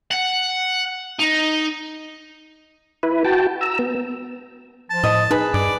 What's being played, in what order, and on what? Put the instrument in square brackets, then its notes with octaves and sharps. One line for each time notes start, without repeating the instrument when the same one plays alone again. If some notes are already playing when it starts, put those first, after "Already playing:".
[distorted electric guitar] F#5
D#4
[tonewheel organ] E4 B4
F#4 G5 A5
A#5 E6
B3
[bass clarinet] F3 [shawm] A5
[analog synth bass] A2 [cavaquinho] D#5
[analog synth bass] D#4 [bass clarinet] G#4 [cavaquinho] B4 B5
[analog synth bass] G2 [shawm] D5